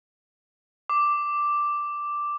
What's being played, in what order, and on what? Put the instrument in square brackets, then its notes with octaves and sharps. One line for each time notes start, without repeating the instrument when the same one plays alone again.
[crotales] D6